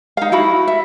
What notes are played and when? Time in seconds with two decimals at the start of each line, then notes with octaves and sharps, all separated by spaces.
0.17 D#4 F5
0.32 E4 F#4 B5
0.68 E5